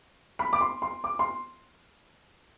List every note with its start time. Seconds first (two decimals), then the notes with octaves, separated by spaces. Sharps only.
0.39 B5
0.53 D6
0.61 C6
0.82 C6
1.04 D6
1.19 C6